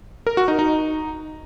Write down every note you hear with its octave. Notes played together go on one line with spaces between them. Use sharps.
A#4
F#4
D#4
D#4